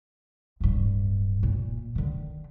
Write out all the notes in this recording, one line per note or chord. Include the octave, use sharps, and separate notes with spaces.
D1 G2
A#2
D3 D#3